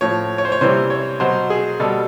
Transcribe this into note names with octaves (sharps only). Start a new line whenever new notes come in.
A2 F3 C#5
C#5
C5
C#5
C3 E3 G3 C5
C#5
B2 F#3 C5
G#4
B2 G3 A4